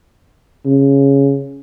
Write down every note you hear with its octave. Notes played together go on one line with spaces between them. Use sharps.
C#3